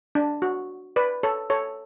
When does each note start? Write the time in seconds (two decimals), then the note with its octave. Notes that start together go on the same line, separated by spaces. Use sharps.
0.15 D4
0.42 F#4
0.96 B4 D5
1.23 A4 C#5
1.50 A4 C#5